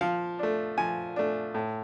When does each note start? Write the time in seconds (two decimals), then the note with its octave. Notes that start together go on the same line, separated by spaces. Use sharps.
0.01 F3 F5
0.39 A3 D4
0.78 F3 G#5
1.16 A3 D4
1.54 A2